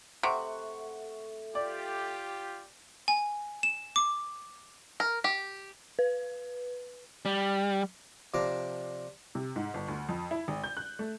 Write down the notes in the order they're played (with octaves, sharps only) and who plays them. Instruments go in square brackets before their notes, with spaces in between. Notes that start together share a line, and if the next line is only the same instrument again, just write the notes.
[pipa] C3 [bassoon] A3 [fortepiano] F#5 C#6
[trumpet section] F4 G4 [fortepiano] D5
[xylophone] G#5
E7
D6
[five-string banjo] A#4
G4
[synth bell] B4
[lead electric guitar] G3
[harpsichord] C3 F3 D4 A#5 D6
[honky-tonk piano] C3
G#2
G1
D2
F2
E4
G#1
G6
F#6
A3